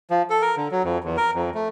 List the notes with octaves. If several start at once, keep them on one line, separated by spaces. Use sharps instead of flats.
F3
A4
A#4
D3
F#3
F2
E2
A#4
F2
A3